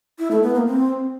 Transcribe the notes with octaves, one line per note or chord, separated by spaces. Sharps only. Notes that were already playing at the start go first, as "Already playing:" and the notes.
E4
A3
B3
A#3
C4